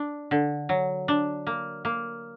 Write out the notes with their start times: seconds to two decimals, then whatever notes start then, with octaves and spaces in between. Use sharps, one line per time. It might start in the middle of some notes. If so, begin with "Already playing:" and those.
Already playing: D4
0.31 D3
0.69 F#3
1.08 D4
1.47 A#3
1.85 A#3